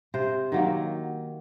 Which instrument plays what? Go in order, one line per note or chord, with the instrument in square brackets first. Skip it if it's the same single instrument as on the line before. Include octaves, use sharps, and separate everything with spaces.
[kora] C3 C5
D#3 F#3 A#3